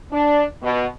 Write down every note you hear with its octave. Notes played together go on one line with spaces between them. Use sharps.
D4
B2